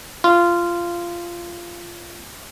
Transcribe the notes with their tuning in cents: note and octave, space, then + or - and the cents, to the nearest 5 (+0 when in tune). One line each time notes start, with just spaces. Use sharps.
F4 -15